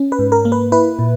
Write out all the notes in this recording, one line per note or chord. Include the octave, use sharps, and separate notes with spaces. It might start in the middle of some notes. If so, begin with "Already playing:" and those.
Already playing: C#4
B4
G#2
A#4
A#3
B4
E4 B4
A#2